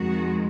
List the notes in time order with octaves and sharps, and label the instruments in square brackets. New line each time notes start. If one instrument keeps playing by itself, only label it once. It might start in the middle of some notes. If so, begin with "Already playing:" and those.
Already playing: [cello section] F2 D#3 G#3 F#4